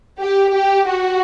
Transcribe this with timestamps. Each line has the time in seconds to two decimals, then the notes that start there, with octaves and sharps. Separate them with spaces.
0.20 G4
0.53 G4
0.88 F#4